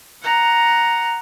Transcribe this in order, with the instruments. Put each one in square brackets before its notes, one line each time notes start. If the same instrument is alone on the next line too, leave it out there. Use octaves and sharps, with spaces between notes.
[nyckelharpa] F#5 A#5